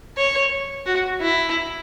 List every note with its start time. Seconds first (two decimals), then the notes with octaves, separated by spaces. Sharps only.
0.17 C#5
0.86 F#4
1.21 E4